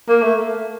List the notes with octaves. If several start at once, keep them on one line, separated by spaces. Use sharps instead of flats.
A#3
A3